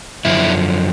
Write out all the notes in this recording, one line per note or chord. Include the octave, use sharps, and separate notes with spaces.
F#2 D3 F3 E4